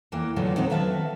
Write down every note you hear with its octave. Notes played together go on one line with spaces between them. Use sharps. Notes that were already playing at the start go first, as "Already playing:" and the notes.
E2 E3 A#3 G5
A#2 D3 F#3 G#3 A3 B3
G#3 B3 C4 D#4 A4
D#3 F#3 B4 E5 F5 A5